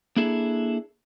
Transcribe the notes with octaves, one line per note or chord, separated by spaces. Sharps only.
A#3 D4 E4 G#4 A4